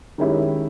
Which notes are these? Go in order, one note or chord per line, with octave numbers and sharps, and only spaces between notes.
D#3 G#3 C#4 E4 G4